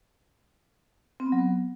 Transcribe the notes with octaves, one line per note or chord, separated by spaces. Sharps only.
C4
B3
F#3
B3